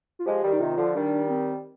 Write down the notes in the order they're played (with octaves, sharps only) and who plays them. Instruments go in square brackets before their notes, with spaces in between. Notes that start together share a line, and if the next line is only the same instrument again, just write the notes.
[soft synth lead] F4
[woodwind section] F3 G#3 [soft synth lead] G4
[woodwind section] D#3 G3
[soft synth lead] D#4
[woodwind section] C3 D#3 [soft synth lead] F4
[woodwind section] D3 F3
[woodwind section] D#3 G3 [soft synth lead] D4
[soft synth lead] C4